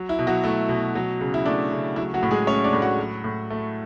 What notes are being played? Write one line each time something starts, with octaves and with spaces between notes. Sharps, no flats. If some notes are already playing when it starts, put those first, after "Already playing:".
Already playing: F#3
E4
B2
F#3 F#4
A3 E4
B2
F#3
C#3
E4
A3 D4
C#3
F#3 E4
F#3 F#4
A2
G#3 G#4
A3 C#4 C#5
D4 D5
A2
F#4 F#5
F#3
A2
A3